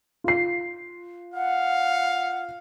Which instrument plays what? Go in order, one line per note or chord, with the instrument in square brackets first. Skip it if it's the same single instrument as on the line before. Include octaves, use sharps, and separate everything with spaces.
[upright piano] F4 C7
[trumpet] F5 [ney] F#5